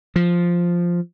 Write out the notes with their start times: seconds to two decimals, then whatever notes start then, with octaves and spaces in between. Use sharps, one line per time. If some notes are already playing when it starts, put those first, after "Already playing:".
0.16 F3